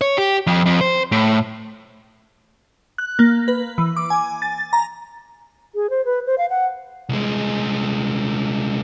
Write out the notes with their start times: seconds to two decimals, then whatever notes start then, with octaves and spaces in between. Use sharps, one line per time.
0.01 C#5
0.18 G4
0.47 F2
0.66 F2
0.81 C5
1.12 A2
2.98 F#6
3.19 A#3
3.48 B4
3.78 E3
3.97 D6
4.10 G#5
4.42 A6
4.73 A#5
5.75 G#4
5.90 C5
6.05 B4
6.27 C5
6.38 F5
6.50 F#5
7.09 C2 G#3